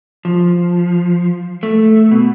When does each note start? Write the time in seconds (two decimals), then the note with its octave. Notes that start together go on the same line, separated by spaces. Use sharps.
0.25 F3
1.63 A3
2.11 B2